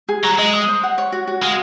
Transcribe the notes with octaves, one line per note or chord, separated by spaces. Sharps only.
G#4
F#3 A#5
G#3 D#5
D#6
C5
F#5
C#5
F#4
F#4
G#3 F5